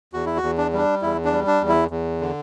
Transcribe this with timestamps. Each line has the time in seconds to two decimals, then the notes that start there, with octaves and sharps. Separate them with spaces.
0.13 E2 F#4
0.26 E4
0.37 F#4
0.43 E2
0.58 D4
0.73 G3 D4
1.02 E2 E4
1.25 D4
1.32 G3
1.47 D4
1.61 E2
1.69 E4
1.91 E2
2.21 D3